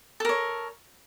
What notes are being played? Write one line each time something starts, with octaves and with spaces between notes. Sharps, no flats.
A4 A#4 C#5